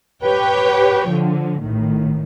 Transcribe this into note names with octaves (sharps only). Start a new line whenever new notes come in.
G4 B4 C#5 G5
D3 F3
A1 A2 D#3